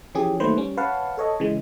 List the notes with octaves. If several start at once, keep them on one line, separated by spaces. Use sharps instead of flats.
E3 F3 C#4 G4 G#4
D#3 F#3 A3 A#3 B4 C5
G3 C#4
B4 C#5 F5 F#5 A5
A4 C#5 D#5
C#3 E3 G#3